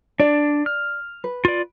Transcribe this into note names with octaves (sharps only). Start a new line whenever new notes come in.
D4 D5
F6
B4
F4 D5